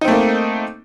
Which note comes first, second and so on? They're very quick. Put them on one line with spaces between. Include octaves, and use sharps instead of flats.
D#4 C4 A3 A#3